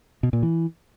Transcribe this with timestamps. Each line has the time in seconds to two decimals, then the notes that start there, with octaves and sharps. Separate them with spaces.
0.23 B2
0.33 A#2
0.43 E3